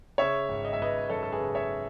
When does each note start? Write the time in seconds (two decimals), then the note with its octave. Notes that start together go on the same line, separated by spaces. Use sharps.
0.18 C#3 C#5 E5
0.49 G#1
0.65 D#5
0.73 E5
0.79 G#1 B4 D#5
1.09 F#2 A4 C#5
1.23 A4
1.32 G#4 B4
1.40 C#3
1.55 C#5 E5